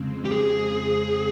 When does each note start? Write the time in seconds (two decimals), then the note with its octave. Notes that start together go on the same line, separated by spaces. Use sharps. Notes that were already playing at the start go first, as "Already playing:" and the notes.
Already playing: F2 C#3 G#3 C4
0.25 G4
0.32 G#4